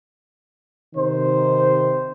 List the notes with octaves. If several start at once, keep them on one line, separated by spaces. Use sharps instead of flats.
C3 D#3 D#4 C5